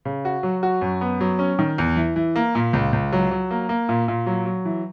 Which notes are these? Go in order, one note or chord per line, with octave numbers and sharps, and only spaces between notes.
C#3
F#4
F#3
F#4
F#2
B3
F#3
C#4
D#3
E2
E3
E3
A#3
A#2
C#2
C#2
F#3
F#3
A#3
A#3
A#2
A#2
F#3
F#3
E3